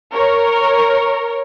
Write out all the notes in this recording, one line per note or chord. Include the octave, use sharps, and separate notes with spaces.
A#4 C#5